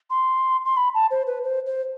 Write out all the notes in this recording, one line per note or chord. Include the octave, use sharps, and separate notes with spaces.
C6
C6
B5
A5
C5
B4
C5
C5